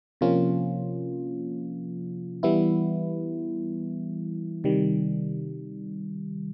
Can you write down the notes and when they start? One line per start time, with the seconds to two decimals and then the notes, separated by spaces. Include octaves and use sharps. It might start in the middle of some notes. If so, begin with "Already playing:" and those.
0.21 C3 F3 A#3 C#4 F4
2.43 E3 G3 B3 E4
4.64 C3 D#3 G3